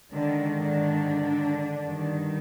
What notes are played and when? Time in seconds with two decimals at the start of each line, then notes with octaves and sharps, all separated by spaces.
0.12 G#2 D3 D#3 D4
0.54 D3 D4
1.84 G2 D#3